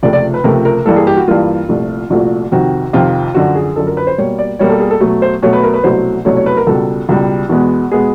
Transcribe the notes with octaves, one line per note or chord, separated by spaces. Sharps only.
C#2 C3 F3 A3 D5
D5
B4
C#2 C3 F3 A3 A#4
A#4
G2 E3 G3 A#3 A4
G#4
G4
F#4
G2 E3 G3 A#3 F4
C2 A#2 F3 A3
C2 A#2 F3 A3 F#4
F2 C3 D#3 F#4
F2 C3 D#3 F4
F#2 D3 F3 F#4
G#4
F#2 D3 F3 A4
A#4
B4
C5
B2 G3 A#3 C#5
D5
B2 G3 A#3 C#5
A4
G#4
A4
B2 F#3 A3
C5
B2 F#3 A3 C#5
B4
A#4
B4
C2 B2 F#3 A3 C5
C2 B2 F#3 A3 C#5
C#5
B4
A#4
C#2 B2 G3 A4
C#2 B2 G3
E2 B2 G#3 B3
B2 G#3 B3 G#4